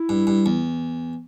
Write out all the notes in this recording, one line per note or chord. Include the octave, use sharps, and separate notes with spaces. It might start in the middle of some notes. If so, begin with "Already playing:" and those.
Already playing: E4
G2
G2
E2